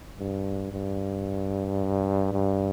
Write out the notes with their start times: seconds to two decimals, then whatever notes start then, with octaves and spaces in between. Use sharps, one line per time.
0.19 G2
0.73 G2
2.33 G2